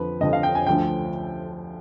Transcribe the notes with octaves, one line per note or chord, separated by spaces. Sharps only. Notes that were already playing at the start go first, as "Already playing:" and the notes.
Already playing: F2 D3 F3 B4
F2 D3 F3 D#5
F5
G5
G#5
D2 D3 F3 G5